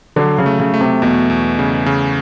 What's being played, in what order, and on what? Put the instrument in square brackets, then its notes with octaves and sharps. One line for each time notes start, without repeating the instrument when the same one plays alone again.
[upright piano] D3 [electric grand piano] F#3
[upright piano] C#3
[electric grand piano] A3
[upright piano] C#3
[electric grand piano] A3
[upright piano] C3
[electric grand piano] E2 [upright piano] B2
[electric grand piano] E2
C#3
C#3